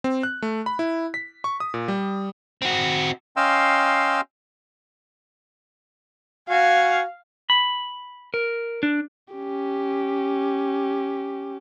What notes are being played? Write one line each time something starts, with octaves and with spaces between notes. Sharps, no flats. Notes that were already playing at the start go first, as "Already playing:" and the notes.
C4
F#6
A3
B5
E4
B6
C#6
D#6
A#2
G3
C4 F#4
C#4 D#5 F5 G5 C6 E6
F#4 F5 G#5
B5
A#4
D4
C#4 G4